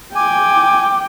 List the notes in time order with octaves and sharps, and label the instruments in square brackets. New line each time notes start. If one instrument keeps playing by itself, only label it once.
[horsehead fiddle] G5 [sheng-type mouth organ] G#5 [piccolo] D6